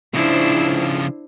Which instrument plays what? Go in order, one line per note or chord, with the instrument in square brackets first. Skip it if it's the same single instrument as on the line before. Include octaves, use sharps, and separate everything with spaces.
[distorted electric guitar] C#3 F3 [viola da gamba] D4 E4 C5